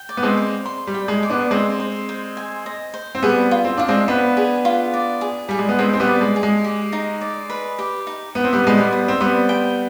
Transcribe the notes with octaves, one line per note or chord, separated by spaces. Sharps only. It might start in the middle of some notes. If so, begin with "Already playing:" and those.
Already playing: G5
D5
B3
G#3 C4
D5
C6
G3
G5
G#3
D5
B3 D4
G#3 C4 D#5
C5
C5
G#5
D#5
C5
C4
G3 B3 G#4
F4
C4
D4 F4
G#3 C4
B3 D4 B4
G#4
F4
D5
G#4
G3 G#4
G#3
B3
G#3 C4 G5
C4
G3 B3
D5
G#3
G#4
G#3
G4
D#4
D5
B4
G4
D#4
B3 G5
C4
G3 B3
G#3 C5
G3 B3
D#6
C4
G3 B3 C6
G5